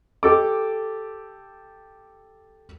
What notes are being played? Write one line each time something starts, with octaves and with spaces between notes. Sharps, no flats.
G4 A4 D6